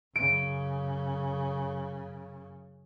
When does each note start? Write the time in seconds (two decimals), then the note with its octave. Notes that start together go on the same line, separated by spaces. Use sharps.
0.16 F#2 C#3 D7